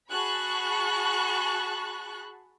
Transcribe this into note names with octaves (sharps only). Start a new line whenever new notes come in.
F#4 G#4 A5 B5 C#6 F#6